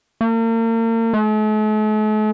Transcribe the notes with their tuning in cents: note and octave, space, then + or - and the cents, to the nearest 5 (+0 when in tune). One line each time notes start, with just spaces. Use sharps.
A#3 -40
A3 -45